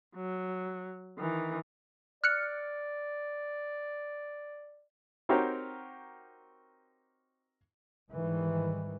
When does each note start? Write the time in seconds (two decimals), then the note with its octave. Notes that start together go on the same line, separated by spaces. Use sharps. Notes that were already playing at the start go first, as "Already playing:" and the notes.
0.16 F#3
1.18 D#3 E3
2.24 D5 F6 F#6 C#7
5.29 C4 D#4 F#4 G4 A#4 C#5
8.12 G#2 D#3 E3 G3